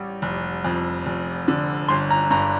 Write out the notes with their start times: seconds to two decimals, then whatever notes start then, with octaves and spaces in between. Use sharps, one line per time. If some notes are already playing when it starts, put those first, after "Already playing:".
Already playing: A1 G3
0.22 F1
0.65 F2
1.06 F1
1.48 D3
1.89 G1 C6
2.11 A#5
2.30 G2 A#5